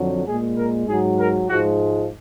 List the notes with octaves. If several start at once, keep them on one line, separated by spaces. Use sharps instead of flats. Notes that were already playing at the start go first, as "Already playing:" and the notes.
Already playing: F2 D3 F#3
A#2 G#3 G#4
A#4
G#2 F#3 G#4
A#4
G#2 F3 G#3 F#4